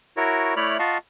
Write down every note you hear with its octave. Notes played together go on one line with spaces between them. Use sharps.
E4 F#4 A#4 C#5
A3 E4 C#5 D5 B5 F6
F4 D#5 F5 F#5 A5 C#6